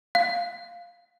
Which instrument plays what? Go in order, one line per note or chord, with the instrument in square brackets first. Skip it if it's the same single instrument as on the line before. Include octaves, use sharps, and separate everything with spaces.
[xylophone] F5